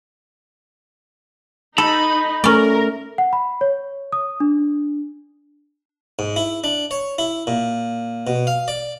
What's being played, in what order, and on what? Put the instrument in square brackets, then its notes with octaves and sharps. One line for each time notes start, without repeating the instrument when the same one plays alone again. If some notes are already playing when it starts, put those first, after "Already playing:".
[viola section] D#4 [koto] A4 [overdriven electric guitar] B5
[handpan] A3 [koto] C#4 D5 [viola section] A#4
[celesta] F#5
B5
C#5
D#6
D4
[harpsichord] G#2
E4
D4
C#5
E4
A#2
B2
F5
D5